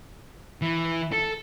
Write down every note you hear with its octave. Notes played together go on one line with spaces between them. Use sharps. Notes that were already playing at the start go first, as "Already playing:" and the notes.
E3
A4